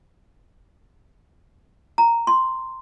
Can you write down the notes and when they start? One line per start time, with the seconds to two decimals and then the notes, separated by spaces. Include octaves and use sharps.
1.98 A#5
2.27 C6